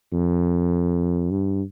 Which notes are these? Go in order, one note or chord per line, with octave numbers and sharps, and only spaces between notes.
F2
G2